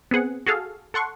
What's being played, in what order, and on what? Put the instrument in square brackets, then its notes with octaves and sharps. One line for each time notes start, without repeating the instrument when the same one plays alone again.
[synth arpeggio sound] B3 C4 G#4 F#5
F#4 G#4 A4 F5
A4 F#5 C6 C#6